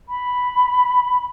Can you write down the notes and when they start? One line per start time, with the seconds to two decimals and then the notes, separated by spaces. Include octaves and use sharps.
0.08 B5